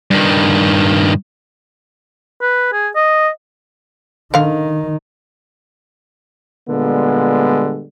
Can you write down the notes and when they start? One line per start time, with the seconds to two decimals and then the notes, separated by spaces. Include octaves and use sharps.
0.11 G2 D#3
2.41 B4
2.73 G#4
2.95 D#5
4.34 D3 D#3 F5
6.70 A#2 D3 G3 G#3 B3